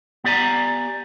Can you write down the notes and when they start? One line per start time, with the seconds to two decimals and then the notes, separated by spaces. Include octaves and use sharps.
0.24 B3 G4 D5 G#5 A#5